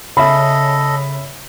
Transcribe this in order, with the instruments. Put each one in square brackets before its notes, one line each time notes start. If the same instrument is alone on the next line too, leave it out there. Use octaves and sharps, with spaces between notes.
[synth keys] C#3 [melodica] A4 D#5 [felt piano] E5 B5